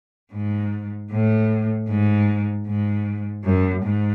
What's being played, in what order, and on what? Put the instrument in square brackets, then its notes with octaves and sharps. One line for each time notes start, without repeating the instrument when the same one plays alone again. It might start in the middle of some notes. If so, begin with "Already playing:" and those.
[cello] G#2
A2
G#2
G#2
F#2
G#2